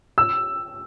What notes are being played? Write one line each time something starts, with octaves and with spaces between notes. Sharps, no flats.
E6